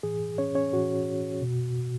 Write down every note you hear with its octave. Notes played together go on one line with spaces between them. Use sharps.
A2 E3 G#4
C#4 C#5
C#4 C#5
A2 E3 F#4
B2